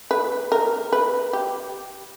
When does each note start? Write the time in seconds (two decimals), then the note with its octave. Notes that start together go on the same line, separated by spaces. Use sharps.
0.11 B4
0.52 A#4
0.92 B4
1.33 G4